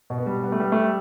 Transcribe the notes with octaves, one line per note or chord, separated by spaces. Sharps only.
B2
B3
G3
G3 B3
A3
G3
G3 A3